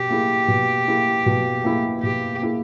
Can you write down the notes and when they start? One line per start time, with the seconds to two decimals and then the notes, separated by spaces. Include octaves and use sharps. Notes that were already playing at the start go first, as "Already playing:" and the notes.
Already playing: B2 G4
0.10 A#3 E4 G#4
0.48 B2
0.88 A#3 E4 G#4
1.26 B2
1.64 A#3 E4 G#4
2.02 B2 G4
2.42 A#3 E4 G#4